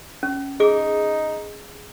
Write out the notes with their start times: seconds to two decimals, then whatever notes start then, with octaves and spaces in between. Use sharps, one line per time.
0.23 C#4
0.60 D#4 G#4 D6